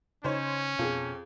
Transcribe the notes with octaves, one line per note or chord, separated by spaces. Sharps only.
C#3 C#4 D#4 C5 C#5
F2 B2 F4 G#4